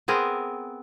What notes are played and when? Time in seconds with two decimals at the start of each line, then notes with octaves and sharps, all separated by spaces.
0.08 B3 C4 G#4 A#4